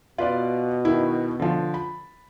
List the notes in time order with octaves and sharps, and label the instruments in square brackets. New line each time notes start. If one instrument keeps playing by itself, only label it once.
[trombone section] B2 [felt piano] F4 B4 D5
[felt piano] D#3 E4
D3 F3
B5